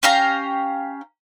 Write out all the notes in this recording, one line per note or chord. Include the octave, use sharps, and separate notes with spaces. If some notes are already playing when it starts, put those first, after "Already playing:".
C#4 G4 F5 A#5